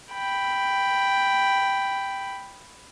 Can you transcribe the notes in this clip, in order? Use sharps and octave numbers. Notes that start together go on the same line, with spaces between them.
G5 B5